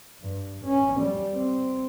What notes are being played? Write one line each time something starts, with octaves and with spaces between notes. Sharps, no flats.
G2
C#4
G3
C4